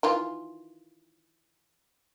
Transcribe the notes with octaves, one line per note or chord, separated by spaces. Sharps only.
D#3 E3 F4